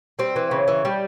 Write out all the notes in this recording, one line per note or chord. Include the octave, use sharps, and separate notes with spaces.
G3 C4
E3
C#3
E3
G3